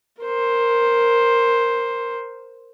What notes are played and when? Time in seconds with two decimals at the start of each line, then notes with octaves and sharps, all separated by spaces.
0.22 A#4 C5